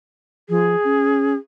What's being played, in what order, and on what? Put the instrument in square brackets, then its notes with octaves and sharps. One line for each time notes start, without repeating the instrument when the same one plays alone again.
[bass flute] F3 [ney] G#4
[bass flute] C#4